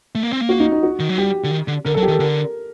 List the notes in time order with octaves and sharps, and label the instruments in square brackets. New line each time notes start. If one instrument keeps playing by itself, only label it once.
[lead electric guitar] A3
A#3
C4
A#3
[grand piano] F#4
D#4
D#4
F#4
[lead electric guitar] D#3
F#3
[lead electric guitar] G3 [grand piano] G4
[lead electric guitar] D3
D#3
D3
[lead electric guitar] D3 [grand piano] A#4
[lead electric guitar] F#3 [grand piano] A4
[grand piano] G4
[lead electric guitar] D#3
[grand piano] A4
[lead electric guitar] D3 [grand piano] A#4